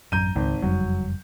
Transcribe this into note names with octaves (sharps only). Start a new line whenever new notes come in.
A1 F#2 A#5 G6 D#7
G#1 C#2
F#1 F2 F#3 G3